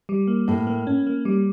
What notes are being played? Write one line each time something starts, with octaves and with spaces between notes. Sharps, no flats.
G3
A#3
A2 A#3
A#3
C#4
A#3
G3